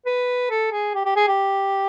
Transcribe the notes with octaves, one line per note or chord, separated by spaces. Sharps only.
B4
A4
G#4
G4
G4
G#4
G4